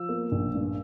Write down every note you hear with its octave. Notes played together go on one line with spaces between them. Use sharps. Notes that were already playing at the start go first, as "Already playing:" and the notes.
Already playing: F3 E6
A#3
A#1
G2